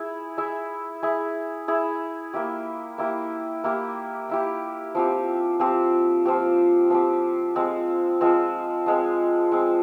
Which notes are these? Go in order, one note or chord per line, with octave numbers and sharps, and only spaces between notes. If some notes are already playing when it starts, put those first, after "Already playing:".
Already playing: E4 G#4 E5
E4 G#4 E5
E4 G#4 E5
E4 G#4 E5
A#3 E4 G4
A#3 E4 G4
A#3 E4 G4
A#3 E4 G4
F3 C4 G4
F3 C4 G4
F3 C4 G4
F3 C4 G4
F3 G#3 C4
F3 G#3 C4
F3 G#3 C4
F3 G#3 C4